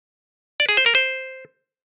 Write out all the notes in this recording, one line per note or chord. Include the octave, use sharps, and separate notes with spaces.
D5
G#4
C5
A#4
C5